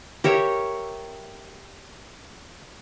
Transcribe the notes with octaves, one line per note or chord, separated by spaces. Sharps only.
G4 A#4 C#5 E5